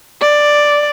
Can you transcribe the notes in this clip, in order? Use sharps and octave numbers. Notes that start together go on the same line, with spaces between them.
D5